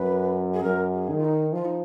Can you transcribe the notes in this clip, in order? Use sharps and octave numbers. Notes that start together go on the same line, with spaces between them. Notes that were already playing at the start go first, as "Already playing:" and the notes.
Already playing: F#2 B4
G#4
F#2 A#4
G#4
D#3
F4
D#4
F3 F4
D#4